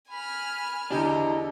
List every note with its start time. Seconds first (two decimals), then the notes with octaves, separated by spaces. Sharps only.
0.10 G#5 B5 F6
0.90 E2 D3 D4 E4 G4 D#5 A#5